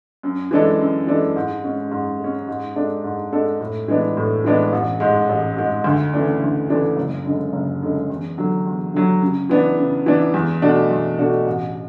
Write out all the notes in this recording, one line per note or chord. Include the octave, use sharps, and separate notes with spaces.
F#2
E3 G#3 D4 A4
F#2
E3 G#3 D4 A4
G#2
G#3 C#4
G#2
G#3 C#4
G#2
G#3 D4 A4
G#2
G#3 D4 A4
A2
E3 G#3 B3 D4
A2
E3 G#3 B3 D4
A1
G#2 G#3
A1
G#2 G#3
D2
C#3 E3 A3 D4
D2
C#3 E3 A3 D4
F#1
F#2 D3 G#3
F#1
F#2 D3 G#3
E2
D3 F#3
E2
D3 F#3
C#3
E3 B3 D4
C#3
E3 B3 D4
E2
B2 A3 D4 F#4
E2
B2 A3 D4 F#4
A1